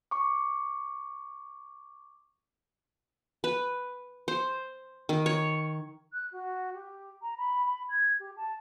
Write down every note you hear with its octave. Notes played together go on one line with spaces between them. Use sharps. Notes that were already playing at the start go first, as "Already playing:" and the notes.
C#6 D6
B4
C5
D#3
C#5
F#6
F#4
G4
A#5
B5
B5
G#6
G4
A5